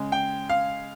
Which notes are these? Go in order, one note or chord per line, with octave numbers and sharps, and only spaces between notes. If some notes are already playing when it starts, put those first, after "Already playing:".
Already playing: C#3 G#3
G5
F5